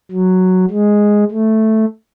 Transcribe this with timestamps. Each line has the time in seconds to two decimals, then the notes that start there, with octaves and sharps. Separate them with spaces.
0.12 F#3
0.71 G#3
1.31 A3